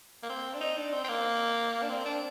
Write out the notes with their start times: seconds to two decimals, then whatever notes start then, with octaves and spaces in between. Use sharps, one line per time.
0.23 A#3
0.29 C4
0.54 D4
0.61 D#4
0.77 D4
0.93 C4
1.04 C4
1.09 A#3
1.82 D4
1.89 C4
2.05 D4